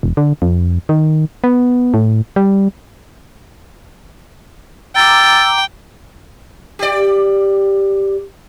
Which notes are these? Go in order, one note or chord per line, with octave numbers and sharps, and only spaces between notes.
E1
D3
F2
D#3
B3
A2
G3
G5 A#5 D6 E6 A6
G4 D5